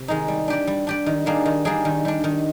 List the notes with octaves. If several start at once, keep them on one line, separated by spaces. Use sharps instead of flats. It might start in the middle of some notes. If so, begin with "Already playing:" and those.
Already playing: C3
D#3 G#3 D#4
G3
D4 G4 D5
G3
D4 G4 D5
D#3
G3 A#3 D4 G#4
D#3
G3 A#3 D4 G#4
D#3
G3 D4
D#3